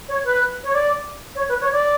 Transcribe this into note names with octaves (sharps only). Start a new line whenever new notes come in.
C#5
B4
C#5
D5
C#5
B4
C#5
D5